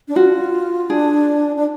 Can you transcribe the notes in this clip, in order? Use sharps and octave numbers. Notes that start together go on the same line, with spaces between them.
D4
F4 F#4
D4 G#4
D4